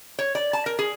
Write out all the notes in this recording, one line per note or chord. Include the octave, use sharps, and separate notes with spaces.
C#5
D5
A5
A#4
G#4